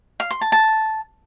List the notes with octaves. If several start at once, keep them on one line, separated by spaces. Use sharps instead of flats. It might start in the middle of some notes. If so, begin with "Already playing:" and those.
F5
C6
A5
A5